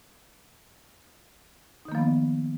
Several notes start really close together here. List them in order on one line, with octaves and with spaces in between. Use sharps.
D#4 D#3 A#3 F3 B3